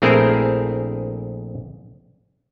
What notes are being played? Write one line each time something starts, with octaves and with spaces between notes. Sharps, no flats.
A#1 A3 C4 E4 G#4 A#4